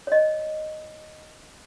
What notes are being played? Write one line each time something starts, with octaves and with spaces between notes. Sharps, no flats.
C#5 D#5